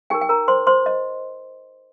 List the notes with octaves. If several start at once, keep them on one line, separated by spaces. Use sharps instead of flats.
D#4 G4 A#4 G5
G5
A#4 A#5
C5 C6
C5 C6
D#5